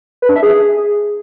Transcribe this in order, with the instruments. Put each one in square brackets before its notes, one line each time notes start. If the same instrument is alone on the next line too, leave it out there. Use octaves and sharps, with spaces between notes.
[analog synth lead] B4
D4
E5
G#4